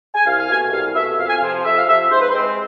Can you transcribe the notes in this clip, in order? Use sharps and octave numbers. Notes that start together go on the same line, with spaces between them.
G#5
C2 F5
F5
B2 A3 G#5
C2 F5
B2 A3 E5
F2 F5
G#5
F5
C3 F3
F2 E5
F5
C3 F3 E5
G#2 C5
B4
C5
G#3 C4